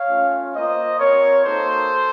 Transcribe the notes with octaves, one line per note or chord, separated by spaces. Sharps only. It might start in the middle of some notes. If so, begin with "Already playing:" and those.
Already playing: C#5 F5
A3 C#4 F4
A#3 F4 C5 D#5
C4 F4 A#4 C#5
A#3 D#4 F#4 A4 C5